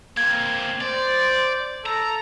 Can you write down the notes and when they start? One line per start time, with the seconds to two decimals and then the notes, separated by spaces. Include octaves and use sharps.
0.17 A#3 C4 G#6
0.81 C5 D5
1.86 A4 A#5